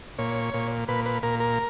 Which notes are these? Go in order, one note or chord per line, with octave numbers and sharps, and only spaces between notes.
A#2 C#5
A#2
A#2 B4
B4
A#2 A#4
A#4